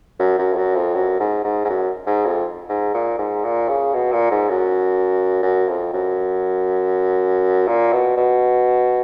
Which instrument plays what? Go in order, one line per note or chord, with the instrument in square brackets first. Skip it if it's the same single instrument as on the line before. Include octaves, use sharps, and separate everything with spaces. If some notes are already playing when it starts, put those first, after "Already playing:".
[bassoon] F#2
F#2
F2
F#2
F2
F#2
G#2
G#2
G#2
F#2
G#2
F2
G#2
A#2
G#2
A#2
C#3
B2
A#2
G#2
F#2
F#2
F2
F#2
A#2
B2
B2